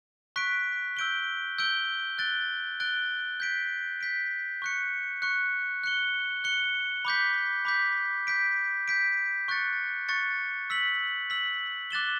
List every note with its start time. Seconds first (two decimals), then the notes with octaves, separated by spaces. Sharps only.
0.36 C#6 F#6 B6 D7
0.97 E6 G6 D7 G7
1.59 E6 G6 D7 G7
2.18 F#6 A6 D7 G7
2.80 F#6 A6 D7 G7
3.40 G6 B6 D7
4.01 G6 B6 D7
4.62 C#6 F#6 C#7
5.22 C#6 F#6 C#7
5.84 F#6 C#7 G7
6.44 F#6 C#7 G7
7.05 B5 D6 G6 B6
7.65 B5 D6 G6 B6
8.27 G6 B6 D7
8.88 G6 B6 D7
9.48 C#6 F#6 A6 C#7
10.08 C#6 F#6 A6 C#7
10.70 E6 B6 F#7
11.30 E6 B6 F#7
11.91 D6 F#6 A6 E7 G7